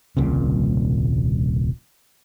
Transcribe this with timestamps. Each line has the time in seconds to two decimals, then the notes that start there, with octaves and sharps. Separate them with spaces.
0.17 D#1 C2 A#2 C#3